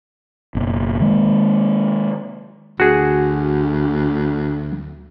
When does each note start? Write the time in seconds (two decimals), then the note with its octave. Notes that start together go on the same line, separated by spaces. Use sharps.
0.55 F#1 B2
1.00 D#3 G#3 A#3
2.80 D2 F#4 G#4